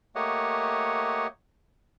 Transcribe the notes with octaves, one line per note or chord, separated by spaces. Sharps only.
A3 A#3 G4 C#5 D#5 F#5